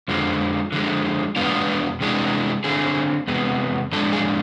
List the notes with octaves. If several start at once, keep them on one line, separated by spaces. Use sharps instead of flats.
F2 D3 F3 G#3
D3 F3 G#3
E2 B2 G#3 B3 D4 F4
C3 E3 G#3 D4
D3 A3 C4 G#4
E2 C3 G#3 B3
A2 F3 G#3 D4 A4
G#4